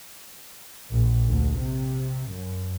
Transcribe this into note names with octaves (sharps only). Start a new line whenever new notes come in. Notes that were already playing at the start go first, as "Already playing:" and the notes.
A#1
D2
C3
F#2